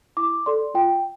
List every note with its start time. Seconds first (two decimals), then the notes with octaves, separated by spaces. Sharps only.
0.17 E4 D6
0.46 A4 D5 C6
0.74 F4 G5